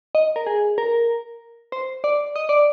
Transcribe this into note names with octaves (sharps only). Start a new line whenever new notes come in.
D#5
A#4
G#4
A#4
C5
D5
D#5
D5